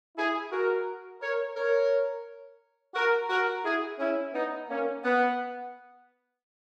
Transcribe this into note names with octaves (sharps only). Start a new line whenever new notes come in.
E4 G#4
F#4 A#4
A#4 C#5
A#4 C#5
F#4 A#4
F#4 A#4
E4 G#4
C#4 E4
B3 D#4
A#3 C#4
B3